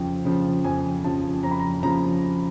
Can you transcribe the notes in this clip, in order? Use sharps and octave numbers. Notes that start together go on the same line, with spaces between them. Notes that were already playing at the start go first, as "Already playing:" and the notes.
Already playing: F2 C#3 F3 G5
C#3 F3
F2 G#5
C#3 F3 A5
F2 A#5
B5
A#5
C#3 F3 A#5